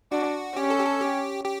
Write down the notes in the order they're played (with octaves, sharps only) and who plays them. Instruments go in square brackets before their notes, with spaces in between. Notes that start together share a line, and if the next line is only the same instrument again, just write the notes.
[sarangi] D4 [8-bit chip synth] F#4
[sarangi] C#4 [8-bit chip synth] G4
[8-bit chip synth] A4
G4
A4
G4
G4